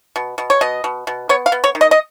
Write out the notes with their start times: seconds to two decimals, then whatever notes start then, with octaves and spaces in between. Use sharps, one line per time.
0.16 B2
0.38 B2
0.50 C#5
0.61 B2 D#5
0.84 B2
1.07 B2
1.29 B3 C#5
1.46 F5
1.52 B3
1.64 C#5
1.75 D#3
1.81 D#5
1.91 D#5